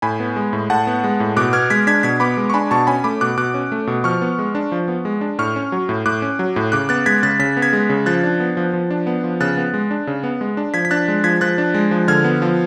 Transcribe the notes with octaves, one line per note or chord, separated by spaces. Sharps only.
A2 G#5 B5
B3
G#3
A2
A2 F#5 A5
B3
G#3
A2
B2 D6 F#6
B3 F6 G#6
G#3 G#6 B6
D4 G#6 B6
B2 G#6 B6
B3 B5 D6
G#3
C#6
D4 G#5 B5
B2 A5 C#6
C#4 G#5 B5
A3 B5 D6
B2 D6 F#6
B2 D6 F#6
C#4
A3
B2
F3 C#6 F6
B3
G#3
D4
F3
B3
G#3
D4
A2 C#6 F6
C#4
F#3
A2
A2 D6 F#6
C#4
F#3
A2
C#3 D6 F#6
B3 F#6 A6
G#3 G#6 B6
C#3 F#6 A6
C#3 B6
B3
G#6 B6
G#3
C#3
F3 F#6 A6
D4
B3
F3
F3
D4
B3
F3
C#3 F#6 A6
B3
G#3
D4
C#3
B3
G#3
D4
F3 G#6 B6
B6
D4 F#6 A6
G#3
F3 G#6 B6
F3 F#6 A6
D4
G#3
F3
D3 F6 G#6
B3
F3